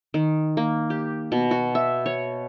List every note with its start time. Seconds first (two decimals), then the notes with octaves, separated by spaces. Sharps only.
0.14 D#3
0.57 A#3
0.90 G4
1.32 B2
1.51 F#4
1.75 E5
2.06 C#5